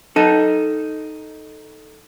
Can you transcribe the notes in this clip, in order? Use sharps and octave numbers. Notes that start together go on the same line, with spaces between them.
D#4 A4